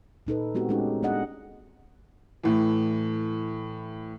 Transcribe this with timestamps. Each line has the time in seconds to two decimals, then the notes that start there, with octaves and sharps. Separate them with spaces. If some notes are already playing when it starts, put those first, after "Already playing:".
0.27 A#2 D#4 A4 B4
0.54 G#3 B3 C4 F#4 G4
0.69 G#3 A3 C#4 D#4 G4 A4
1.03 G#3 B3 D4 G#4 D#5 F#5
2.43 A2 E3